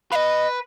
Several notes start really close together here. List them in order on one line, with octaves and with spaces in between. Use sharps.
B4 F5 D#5